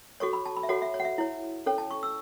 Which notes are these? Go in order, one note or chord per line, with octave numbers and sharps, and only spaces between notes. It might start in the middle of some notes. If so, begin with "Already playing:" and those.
F#4 A4 C#5 C#6
B5
A5
B5
E5
F#4 A4 C#5 F#5
E5
C#5
F#5
E5
E4 C#5
C#4 A4 C#5
A5
C#6
E6